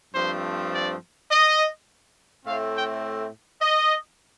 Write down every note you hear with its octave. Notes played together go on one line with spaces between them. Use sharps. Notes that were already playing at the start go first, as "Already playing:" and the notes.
G2 F3 A3 C4 C5
D5
D#5
A2 A3 C4 F5
G5
D#5